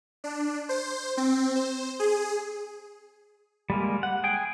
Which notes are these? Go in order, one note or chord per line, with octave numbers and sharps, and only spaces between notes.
D4
C5
C4
C5
G#4
G3 G#3 A#3
F#5
G#4 G5